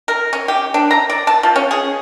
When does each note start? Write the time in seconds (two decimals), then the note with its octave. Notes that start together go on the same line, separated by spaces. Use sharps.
0.08 A#4
0.33 C#4
0.48 G4
0.74 D4
0.91 A#5
1.10 D5
1.27 A5
1.43 F3
1.56 C#4
1.71 G#4